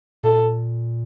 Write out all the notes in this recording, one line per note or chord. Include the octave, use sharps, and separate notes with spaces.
A#2 A4